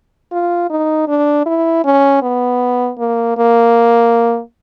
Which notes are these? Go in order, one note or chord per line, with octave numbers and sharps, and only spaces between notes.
F4
D#4
D4
E4
C#4
B3
A#3
A#3